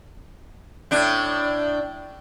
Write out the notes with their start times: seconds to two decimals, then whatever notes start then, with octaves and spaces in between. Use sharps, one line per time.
0.91 A2 D4